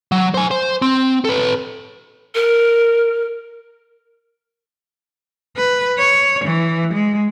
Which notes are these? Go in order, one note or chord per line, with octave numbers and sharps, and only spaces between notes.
F#3
C5 G#5
C5
C4
A4 B4
A#4
B4
C#5
E3
G#3